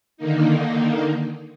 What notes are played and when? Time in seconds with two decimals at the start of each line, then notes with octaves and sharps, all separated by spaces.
0.17 D3 D#3 A#3 D#4